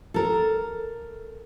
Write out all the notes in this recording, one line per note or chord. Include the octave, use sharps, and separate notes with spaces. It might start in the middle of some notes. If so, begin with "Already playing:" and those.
A4 A#4